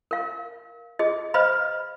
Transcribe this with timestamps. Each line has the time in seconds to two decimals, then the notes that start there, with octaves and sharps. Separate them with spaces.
0.11 A#4 F5
0.99 G#4 D#5
1.34 B4 C5 D#5 F5 B5